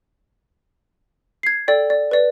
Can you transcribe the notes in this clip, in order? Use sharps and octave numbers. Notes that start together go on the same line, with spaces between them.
G#6 C7
A4 D5 G5
D5
B4 D5